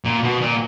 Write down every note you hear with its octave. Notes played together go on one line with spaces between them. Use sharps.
A#2
B2
A#2